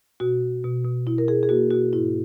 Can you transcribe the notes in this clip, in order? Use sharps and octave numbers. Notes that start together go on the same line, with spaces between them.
B2 F#4
B2
B2
B2
B2 E4
A#4
B2 G#4
G#4
A#3 F#4
B2 F#4
G#2 E4